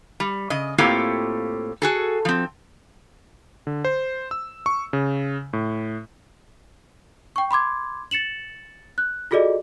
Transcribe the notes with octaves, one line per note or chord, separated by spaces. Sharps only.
G3
C#3 D#5
A2 A#3 C4 F4 G4 A4
F#4 G#4 A4
F3 C4
D3
C5
E6
C#6
C#3
A2
G5 C#6
B5 C6 D6 G#6
A6 C#7 E7 F#7
F#6
F4 F#4 G#4 A4 D5 D#5